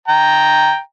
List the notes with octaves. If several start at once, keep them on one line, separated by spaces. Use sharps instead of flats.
G5 A#5